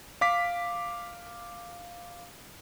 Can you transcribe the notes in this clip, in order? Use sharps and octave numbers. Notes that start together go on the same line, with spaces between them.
F5 D6 B6